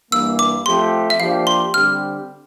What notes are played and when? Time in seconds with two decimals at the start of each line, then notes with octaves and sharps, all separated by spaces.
0.11 G2 E3 A#3 E6
0.39 D6
0.66 F3 A3 C4 G4 C6
1.10 E5
1.20 F3 A#3 D4 G4 C5 F5
1.47 C6
1.74 D3 G3 C4 G4 F6